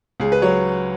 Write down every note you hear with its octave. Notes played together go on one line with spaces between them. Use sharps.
C#2 G#4
B4
F#3 C#5